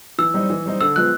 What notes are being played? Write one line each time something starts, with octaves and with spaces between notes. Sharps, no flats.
E3 E6
G3 C4 D#4
E3
G3 C4 D#4
D3 E6
F3 G#3 B3 F#6